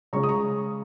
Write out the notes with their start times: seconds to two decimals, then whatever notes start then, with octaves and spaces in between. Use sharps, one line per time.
0.13 C#3 G#3 C#4 A#5 C#6
0.23 D#6
0.29 A#5 C#6